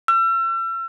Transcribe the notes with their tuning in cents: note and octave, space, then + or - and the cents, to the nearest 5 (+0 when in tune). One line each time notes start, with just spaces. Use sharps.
E6 +40